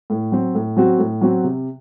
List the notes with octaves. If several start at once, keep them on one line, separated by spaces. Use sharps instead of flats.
A2
F#3 C4
A2
F#3 C4 F#4
A2
F#3 C4 F#4
C3